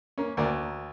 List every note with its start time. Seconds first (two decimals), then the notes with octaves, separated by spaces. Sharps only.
0.18 A#3 C#4
0.37 D2 A#4 D5